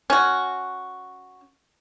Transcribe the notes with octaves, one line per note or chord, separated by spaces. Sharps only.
C#4 F#4